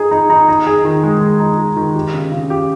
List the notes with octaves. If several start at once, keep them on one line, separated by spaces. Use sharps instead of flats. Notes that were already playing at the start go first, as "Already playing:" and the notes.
Already playing: D#4 G#4
D#4
D#4
D#4
G#4
D#3
G#3
G#3
D#4
G#4
D#3
G4
C#3
C#3
G4